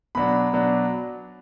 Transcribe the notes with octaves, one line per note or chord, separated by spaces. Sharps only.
B2 F#3 D4 B5
B2 F#3 D4